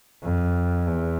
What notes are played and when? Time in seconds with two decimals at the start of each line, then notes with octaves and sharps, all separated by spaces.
0.23 F2
0.87 E2